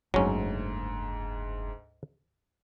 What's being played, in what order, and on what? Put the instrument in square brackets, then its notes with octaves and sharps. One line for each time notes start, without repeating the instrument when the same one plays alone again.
[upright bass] F#1 [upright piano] D2 G#2 [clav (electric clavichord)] F#3 C#4